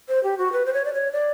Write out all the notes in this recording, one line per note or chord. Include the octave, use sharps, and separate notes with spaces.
C5
G4
F#4
B4
C5
C#5
D5
C#5
D5